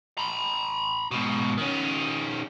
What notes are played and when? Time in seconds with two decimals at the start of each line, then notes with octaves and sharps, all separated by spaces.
0.18 A#5 B5
1.11 G#2 B2
1.58 D#3 C#4